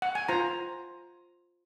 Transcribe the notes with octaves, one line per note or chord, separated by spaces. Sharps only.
F#5
G#5
F4 C5 A#5